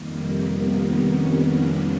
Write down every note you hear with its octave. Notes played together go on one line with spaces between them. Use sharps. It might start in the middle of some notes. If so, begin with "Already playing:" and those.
Already playing: F2 C3 D#3 G3 A#3
B3
C#4
D4